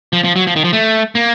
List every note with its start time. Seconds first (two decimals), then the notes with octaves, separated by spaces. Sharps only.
0.13 F3
0.24 F3
0.36 F#3
0.47 F3
0.56 D#3
0.65 F3
0.73 A3
1.15 A#3